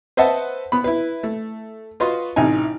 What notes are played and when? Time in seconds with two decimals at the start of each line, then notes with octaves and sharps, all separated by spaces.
0.17 B4 C5 D#5 E5 F#5 A5
0.72 B3 B5
0.84 E4 B4
1.23 A3
2.00 F4 F#4 B4 D#5 C6
2.36 A1 C3 D#4 G#5